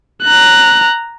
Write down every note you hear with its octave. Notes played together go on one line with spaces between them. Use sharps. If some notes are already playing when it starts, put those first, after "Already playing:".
A#5 F#6